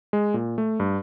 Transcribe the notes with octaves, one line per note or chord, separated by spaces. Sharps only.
G#3
A#2
A3
G2